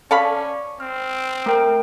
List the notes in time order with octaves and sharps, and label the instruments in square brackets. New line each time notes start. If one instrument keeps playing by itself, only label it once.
[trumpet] C#4 [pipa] A4 F5 B5 [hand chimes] D5 C#6 D6
[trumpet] C4 [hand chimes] F6
[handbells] A3 A#4 G5